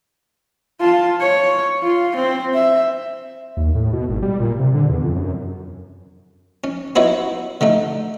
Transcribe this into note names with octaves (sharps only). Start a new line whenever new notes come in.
F4 A5
C#5
F4
C4
E5
D#2
A2
B2
G#1
G3
A#2
C3
D3
E2
F2
F#2
C#4
B3 D#4 E4 F#4 B4 C#5
D3 A3 D#4